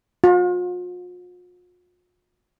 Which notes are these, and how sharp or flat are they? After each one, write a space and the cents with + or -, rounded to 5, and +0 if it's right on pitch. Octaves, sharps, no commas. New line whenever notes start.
F4 +45